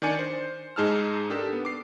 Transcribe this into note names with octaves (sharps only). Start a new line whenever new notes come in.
D#3 D4 D5 G#5 C#7
C5
G#2 D#4 G#4 A5 E6 F6
D4 G4 A4 A#4
B3
D6 C7